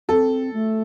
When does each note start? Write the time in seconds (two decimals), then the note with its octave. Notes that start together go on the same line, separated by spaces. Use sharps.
0.09 C4 A4
0.54 A3